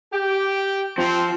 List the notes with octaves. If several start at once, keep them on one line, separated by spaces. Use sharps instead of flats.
G4 G5
F3 C4